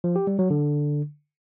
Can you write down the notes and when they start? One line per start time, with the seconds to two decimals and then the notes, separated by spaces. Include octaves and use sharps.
0.04 F3
0.16 G4
0.27 G3
0.39 F#3
0.50 D3